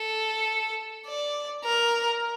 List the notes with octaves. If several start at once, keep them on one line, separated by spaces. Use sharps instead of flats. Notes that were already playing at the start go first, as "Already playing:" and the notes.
Already playing: A4
D5
A#4